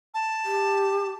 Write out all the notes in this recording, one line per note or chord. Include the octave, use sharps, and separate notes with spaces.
A5
G4